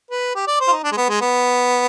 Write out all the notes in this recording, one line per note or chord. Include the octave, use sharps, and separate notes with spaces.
B4
G4
D5
C5
F4
D#4
D4
G#3
B3
G#3
B3